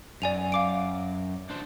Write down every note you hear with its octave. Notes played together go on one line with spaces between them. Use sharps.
F#2 D5 G#5 F7
F5 D6 D7
D4 C5